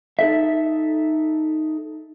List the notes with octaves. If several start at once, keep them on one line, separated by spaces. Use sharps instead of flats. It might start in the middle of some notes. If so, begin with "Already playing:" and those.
D#4 A4 E5